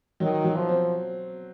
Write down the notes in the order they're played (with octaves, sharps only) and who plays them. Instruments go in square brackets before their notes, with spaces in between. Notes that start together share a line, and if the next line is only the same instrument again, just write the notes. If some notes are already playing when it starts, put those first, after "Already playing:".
[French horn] D#3 [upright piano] F#3
[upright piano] F#3
[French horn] F3
[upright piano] C4